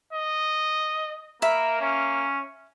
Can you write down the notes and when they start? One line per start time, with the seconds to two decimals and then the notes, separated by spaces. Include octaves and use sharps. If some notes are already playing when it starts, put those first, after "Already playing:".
0.13 D#5
1.42 A#3 A#4 E5 B5
1.81 C#4